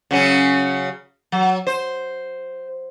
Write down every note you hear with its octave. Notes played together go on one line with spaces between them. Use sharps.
C#3 F#3 C#4
F#3
C5